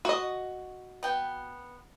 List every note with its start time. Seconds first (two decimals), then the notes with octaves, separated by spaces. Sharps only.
0.05 F#4 D#5
1.03 B3 G5